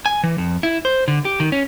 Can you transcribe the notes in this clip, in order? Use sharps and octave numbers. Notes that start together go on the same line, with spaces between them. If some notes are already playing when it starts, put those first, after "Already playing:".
G#5
E3
F2
E4
C5
D3
G4
D#3
C#4